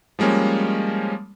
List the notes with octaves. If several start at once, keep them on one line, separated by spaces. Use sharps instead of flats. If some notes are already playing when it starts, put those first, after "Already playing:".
F3 G3 G#3 A#3 C#4